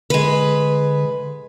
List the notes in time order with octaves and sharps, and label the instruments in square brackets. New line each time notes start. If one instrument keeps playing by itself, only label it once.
[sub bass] D3 [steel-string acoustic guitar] G#3 B4